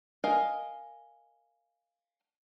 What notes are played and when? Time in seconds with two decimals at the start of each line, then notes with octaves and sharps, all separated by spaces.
0.24 A#4 D#5 F5 G#5